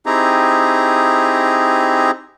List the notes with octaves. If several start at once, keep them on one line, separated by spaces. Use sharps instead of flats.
C4 D#4 E4 G4 G#4 A#5